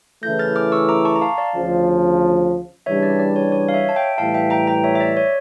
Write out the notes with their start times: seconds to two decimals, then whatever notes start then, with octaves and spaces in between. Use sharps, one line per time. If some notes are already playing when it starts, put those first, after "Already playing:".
0.23 C#3 E3 A3 E4 G6 A#6
0.39 F6 A6
0.56 D6 F6
0.72 C#6 E6
0.89 A#5 D6
1.05 A5 C#6
1.16 A#5
1.22 F5 A5
1.38 D5 F5
1.54 D2 C#3 F3
2.86 C#3 E3 G3 D4 C#5 E5
3.03 D5
3.19 D5
3.36 C#5
3.52 C#5
3.69 F5
3.74 C#5 E5
3.89 A5
3.96 E5 G5
4.18 A2 E3 G3 F5 A5
4.34 E5 G5
4.50 G5 A#5
4.67 G5 A#5
4.84 C#5 E5
4.95 E5
5.00 D5
5.17 C#5